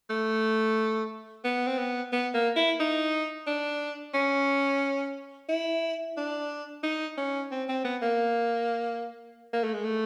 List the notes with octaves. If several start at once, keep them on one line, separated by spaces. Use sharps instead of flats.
A3
B3
C4
B3
B3
A#3
E4
D#4
D4
C#4
E4
D4
D#4
C#4
C4
C4
B3
A#3
A#3
A3
G#3
A3